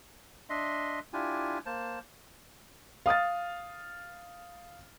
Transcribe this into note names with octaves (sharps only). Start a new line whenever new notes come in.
D4 D#5 E5 C6
D4 E4 F4 G4 G#5
A#3 C5 A5
F5 D#6 F6 A6